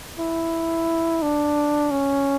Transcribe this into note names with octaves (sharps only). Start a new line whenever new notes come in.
E4
D4
C#4